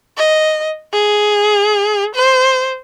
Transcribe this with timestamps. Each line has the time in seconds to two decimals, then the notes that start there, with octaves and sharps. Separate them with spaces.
0.17 D#5
0.93 G#4
2.16 C5